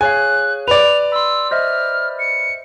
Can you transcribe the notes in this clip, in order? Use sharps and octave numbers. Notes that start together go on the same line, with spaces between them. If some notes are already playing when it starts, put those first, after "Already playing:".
G#4 C#5 F5 G#5 F#6
B4 D5 F7
B5 C6 E6
C5 D#5 E5 F6
C#7